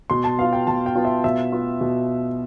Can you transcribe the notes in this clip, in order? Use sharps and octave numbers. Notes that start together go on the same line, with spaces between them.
B2 C6
A5
B3 F4 F5
G5
B2 A5
G5
B3 F4
E5
B2 E5
B3 F4
B2